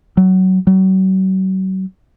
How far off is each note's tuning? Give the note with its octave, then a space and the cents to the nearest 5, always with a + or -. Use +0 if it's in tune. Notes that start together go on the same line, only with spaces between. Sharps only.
F#3 +15
F#3 +40